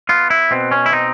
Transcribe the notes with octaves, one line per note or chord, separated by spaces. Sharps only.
B3 F4
E4
B2 C4
C#4
E4
C4 D#4